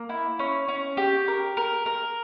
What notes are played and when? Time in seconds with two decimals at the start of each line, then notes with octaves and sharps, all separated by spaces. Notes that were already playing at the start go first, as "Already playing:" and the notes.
Already playing: A#3
0.09 E4
0.39 C#4
0.68 C#4
0.97 G4
1.28 A#4
1.57 A#4
1.86 A#4